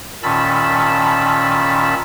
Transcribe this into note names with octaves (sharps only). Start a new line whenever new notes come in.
A#2 D#3 C#4 A5 B5 E6